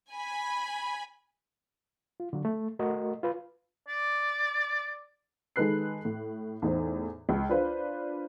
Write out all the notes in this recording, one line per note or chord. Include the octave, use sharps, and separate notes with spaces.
G#5 B5
F4
D3 F#3
A3
A3 F#4 A#4 D#5
F4 B4
D5
D#3 G#3 A4 B4 F#6 C7
A2
E2 A2 D#4 C5
C#2
D4 F4 B4 C5